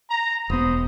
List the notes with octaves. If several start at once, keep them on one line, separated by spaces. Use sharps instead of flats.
A#5
E1 B3 C5 B5 D#6